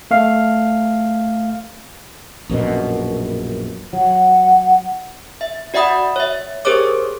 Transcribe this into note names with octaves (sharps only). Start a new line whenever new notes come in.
A3 F5
A#1 F#2 B2
F#3 F#5
E5
F#4 D5 E5 F#5 B5 D#6
C#5 E5
G4 G#4 A#4 C5 C#5 D6